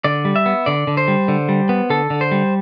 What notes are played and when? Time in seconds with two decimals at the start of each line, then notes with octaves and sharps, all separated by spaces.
0.04 D3 D5
0.25 G3
0.36 E5
0.46 B3
0.66 D3 D5
0.87 D3
0.97 C5
1.08 G3
1.28 D3
1.49 G3
1.69 B3
1.90 D3 A4
2.10 D3
2.21 C5
2.31 G3